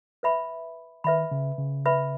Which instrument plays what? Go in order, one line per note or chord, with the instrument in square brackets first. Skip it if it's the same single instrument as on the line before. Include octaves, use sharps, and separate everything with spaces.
[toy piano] B4 E5 B5
[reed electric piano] D#3 [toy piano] B4 E5 B5
[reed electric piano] C#3
C#3
[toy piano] B4 E5 B5